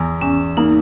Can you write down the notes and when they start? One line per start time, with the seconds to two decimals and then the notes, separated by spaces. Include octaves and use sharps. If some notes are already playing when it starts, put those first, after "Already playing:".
Already playing: E2
0.21 E2 C#4
0.57 A#3 D#4